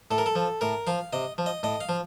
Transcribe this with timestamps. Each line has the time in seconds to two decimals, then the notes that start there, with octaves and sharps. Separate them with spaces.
0.11 A2 A4
0.18 A#4
0.26 A4
0.35 F3
0.61 A2 A#4
0.87 F3 F5
1.13 C3 D#5
1.38 F3
1.46 D#5
1.63 A2 D#5
1.81 F5
1.89 F3